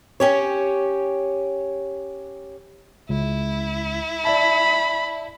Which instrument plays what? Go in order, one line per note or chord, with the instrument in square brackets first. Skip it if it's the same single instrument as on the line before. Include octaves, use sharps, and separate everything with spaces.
[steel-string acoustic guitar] C#4 G4 C#5
[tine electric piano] C#2 [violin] E4
[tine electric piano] D5 E5 A5 [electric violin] B5